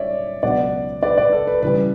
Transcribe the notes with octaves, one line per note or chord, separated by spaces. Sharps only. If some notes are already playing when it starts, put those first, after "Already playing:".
Already playing: C#5 D5 E5
C#2 B2 F#3 B3 D4 D5 F#5
B4 D5
B4 D5
A4
B4
C#3 E3 G3 B4